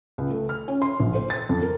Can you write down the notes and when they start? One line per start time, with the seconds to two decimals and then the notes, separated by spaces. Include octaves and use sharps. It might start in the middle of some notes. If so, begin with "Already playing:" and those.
0.18 C#2
0.30 A3
0.49 F6
0.68 C#4
0.82 C6
1.00 A#1
1.15 C5
1.30 A6
1.49 F2
1.62 A#4